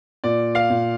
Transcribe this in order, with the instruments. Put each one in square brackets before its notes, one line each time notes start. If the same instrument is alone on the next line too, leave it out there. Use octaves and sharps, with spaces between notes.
[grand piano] A#2 D5
F5
A#2